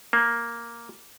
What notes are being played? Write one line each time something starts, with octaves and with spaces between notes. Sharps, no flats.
A#3